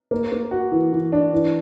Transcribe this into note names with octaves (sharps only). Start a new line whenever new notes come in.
A#3
A#3
F#4
E3
E3
D4
E3